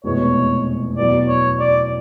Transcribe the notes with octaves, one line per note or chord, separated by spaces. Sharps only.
F1 E2 B2 G#3 B3 C#5
E2 B2 F#3 B3 D5
C#5
D5